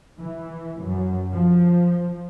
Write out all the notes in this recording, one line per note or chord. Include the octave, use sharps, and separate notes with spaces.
E3
F#2
F3